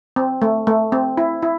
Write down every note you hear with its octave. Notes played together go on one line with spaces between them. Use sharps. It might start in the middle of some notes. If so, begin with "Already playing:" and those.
C4
A3
A3
C4
E4
E4